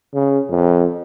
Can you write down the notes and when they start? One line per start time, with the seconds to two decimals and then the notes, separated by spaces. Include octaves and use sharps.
0.14 C#3
0.50 F2